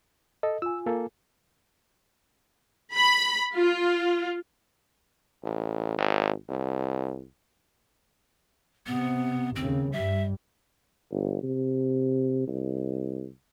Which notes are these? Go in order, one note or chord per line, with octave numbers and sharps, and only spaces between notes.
A4 D#5
F4 G#5 E6
A#3 A4
B5
F4
A1
G#1
C2
C3 B3
D#2 C#3 C4
G2 G3 E5
G1
C3
C2